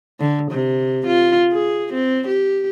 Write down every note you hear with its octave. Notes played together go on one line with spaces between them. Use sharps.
D3
C3
F4
G#4
C4
G4